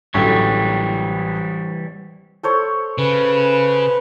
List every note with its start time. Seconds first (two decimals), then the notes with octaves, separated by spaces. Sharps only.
0.14 A1 D3 E3 F#3 G3 G5 C#6
2.43 A4 C5 C#5
2.98 C#3 B4